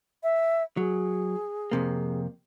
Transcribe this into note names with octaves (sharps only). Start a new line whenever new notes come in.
E5
F#3 G#4
F2 C3 A#3